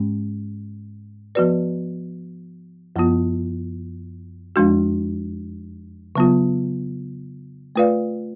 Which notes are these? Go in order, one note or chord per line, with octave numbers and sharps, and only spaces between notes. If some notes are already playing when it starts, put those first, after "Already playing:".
Already playing: G#2 G#3 C#4
F3 B3 F#4 B4 D5
F#2 F3 B3 F4
F2 F3 G#3 D4 F#4
C#3 F#3 B3 F4
A3 F4 B4 D5 F5